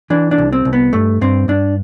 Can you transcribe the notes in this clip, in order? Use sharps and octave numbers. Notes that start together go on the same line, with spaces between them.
E3 D4
D4
C2
C4
C2
B3
G2 A3
G2 C4
G2 D4